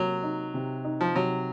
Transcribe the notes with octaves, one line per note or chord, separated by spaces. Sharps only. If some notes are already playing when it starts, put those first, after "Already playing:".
Already playing: C3 F#3 A#3
D#4
C3
D#4
F3
C3 F#3